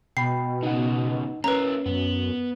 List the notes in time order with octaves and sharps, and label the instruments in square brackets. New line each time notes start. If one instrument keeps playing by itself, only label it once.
[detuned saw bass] B2 [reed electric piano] G5 B5 [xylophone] C7
[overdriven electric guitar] C#3 B3 [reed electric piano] D#4 F#5
[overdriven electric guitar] A#3 E4 [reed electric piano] C#4 [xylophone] B4 A#5
[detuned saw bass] F#2 [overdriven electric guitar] B3